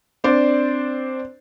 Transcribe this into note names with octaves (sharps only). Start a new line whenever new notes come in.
C4 D4 C5 D5